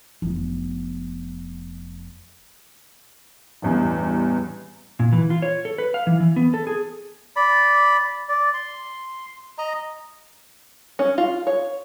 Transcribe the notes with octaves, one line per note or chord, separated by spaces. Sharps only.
F1 B3
A1 E2 G2
A#2
E3
F4
C#5
A4
B4
F5
E3
E3
B3
A4
G#4
D5 B5
D5
C6
D#5 A#5
C#4
F4
C#5